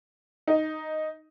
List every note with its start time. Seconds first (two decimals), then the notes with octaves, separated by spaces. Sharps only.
0.47 D#4